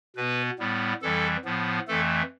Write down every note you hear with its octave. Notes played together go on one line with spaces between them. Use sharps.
B2 B3 B4
A2 G3 B3
F2 E3 G3 A4
A2 F3 B3
F2 E3 A3 A4